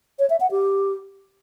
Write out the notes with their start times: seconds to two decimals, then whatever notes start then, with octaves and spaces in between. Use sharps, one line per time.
0.19 C#5
0.30 E5
0.40 F#5
0.51 G4